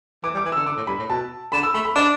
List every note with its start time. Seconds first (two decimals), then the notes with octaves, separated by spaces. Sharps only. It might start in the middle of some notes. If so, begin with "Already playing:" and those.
0.23 E3 D6
0.34 G3
0.37 D6
0.45 E3
0.52 D3 E6
0.66 D3 D6
0.77 A2
0.87 G2 B5
0.99 A2
1.09 B2 A5
1.52 D3 B5
1.63 E6
1.74 A3 B5
1.85 B5
1.96 D4 D5